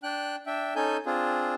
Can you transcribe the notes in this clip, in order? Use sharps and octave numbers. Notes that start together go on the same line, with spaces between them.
D4 G5 F#6
D4 E5 G5
C#4 D#4 A4 G#5 G6
C4 D4 F4 G#4